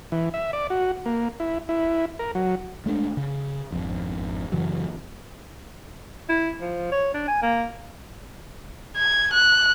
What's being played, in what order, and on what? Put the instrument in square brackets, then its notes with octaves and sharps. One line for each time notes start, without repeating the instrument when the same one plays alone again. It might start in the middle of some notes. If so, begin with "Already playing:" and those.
[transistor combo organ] E3
E5
D5
F#4
A#3
E4
E4
A#4
F#3
[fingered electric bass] G#3 A3 C#4 D4
C#3
G#1 F2
F#2 C#3 E3 F#3
[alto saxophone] E4
F3
C#5
D4
G#5
A#3
[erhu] G#6
F#6